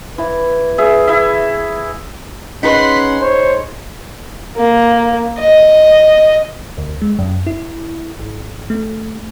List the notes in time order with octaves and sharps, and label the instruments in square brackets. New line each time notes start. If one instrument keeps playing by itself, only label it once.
[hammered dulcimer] E3 [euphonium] B4
[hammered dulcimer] G#4 E5
E3 E5
[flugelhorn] C#4 [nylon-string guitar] D#4 G#4 B4 [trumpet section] F#5 C6 [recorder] B6
[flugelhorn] C5 [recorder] C#5
[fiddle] A#3
D#5
[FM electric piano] D2
G#3
F#2
E4
G#1
A3